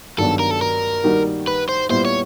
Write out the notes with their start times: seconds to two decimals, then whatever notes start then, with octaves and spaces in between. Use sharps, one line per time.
0.18 G2 D#3 F#3 B3 D4 A4
0.39 A#4
0.51 A4
0.62 A#4
1.04 D#3 G3 A#3 D#4 F#4
1.47 B4
1.69 C5
1.90 A#2 G3 B3 E4 C5
2.05 C#5